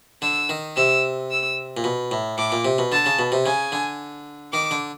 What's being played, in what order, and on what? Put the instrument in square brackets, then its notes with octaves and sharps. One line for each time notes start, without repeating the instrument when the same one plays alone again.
[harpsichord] D3 [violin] E6
[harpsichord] D#3
[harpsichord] C3 [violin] E6
[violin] E6
[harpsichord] A#2
B2
A2
[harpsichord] A2 [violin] D6
[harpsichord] A#2
C3
B2
[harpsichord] D3 [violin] A5
[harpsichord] C#3
B2
C3
[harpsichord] C#3 [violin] G#5
[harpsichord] D3
[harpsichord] D#3 [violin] D6
[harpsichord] D3